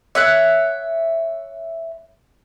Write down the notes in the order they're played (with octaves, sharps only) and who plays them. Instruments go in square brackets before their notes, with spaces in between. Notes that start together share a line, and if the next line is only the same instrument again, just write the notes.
[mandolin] C#5 E5 F#5